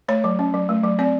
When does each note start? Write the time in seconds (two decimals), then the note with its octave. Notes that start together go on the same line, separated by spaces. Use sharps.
0.08 A3 C#5
0.24 F#3
0.39 C#4
0.54 F#3
0.69 A3
0.84 F#3
0.99 C4 D5